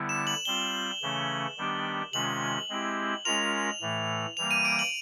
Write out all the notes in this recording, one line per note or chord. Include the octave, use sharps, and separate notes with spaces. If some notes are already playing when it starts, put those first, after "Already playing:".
Already playing: D3 G3 B3 E4
E7
F#7
G3 C4 F4 G7
C#3 E3 A3 C#4
D#3 G3 B3 D4 G4
C3 D#3 G#3 C#4 F4 F#7
G#3 C4 E4 G4
G#3 C#4 F4 A#4 F7
A2 E3 A3
E3 G3 A#3 F7
D#7
D7
F#7